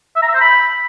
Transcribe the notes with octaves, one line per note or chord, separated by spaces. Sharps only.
E5
A#5
E5
C5
B5